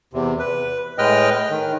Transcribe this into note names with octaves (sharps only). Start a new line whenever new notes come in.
E2 C3
B4
A2 G#3 B4 D#5 G5 F6
D#3